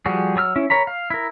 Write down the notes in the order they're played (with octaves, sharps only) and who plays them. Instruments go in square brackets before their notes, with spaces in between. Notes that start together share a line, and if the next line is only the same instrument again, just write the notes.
[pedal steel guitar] F3 G3 F#4 G#4
F#3 G#4 E6 F6
C#4 E4
A#4 C#5 A#5 B5
F5
E4 A#4